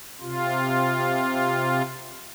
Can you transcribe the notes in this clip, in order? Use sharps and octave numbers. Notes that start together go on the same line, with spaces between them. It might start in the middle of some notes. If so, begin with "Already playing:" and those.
C3 F4